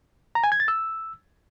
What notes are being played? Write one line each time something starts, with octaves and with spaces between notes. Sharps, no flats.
A#5
G#5
G#6
A6
E6